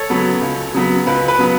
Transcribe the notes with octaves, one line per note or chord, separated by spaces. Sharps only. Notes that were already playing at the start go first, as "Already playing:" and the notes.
Already playing: A4 C#5
C#3 F#3 B3
C#2
C#3 F#3 B3
C#2 B4
B4
C#3 F#3 B3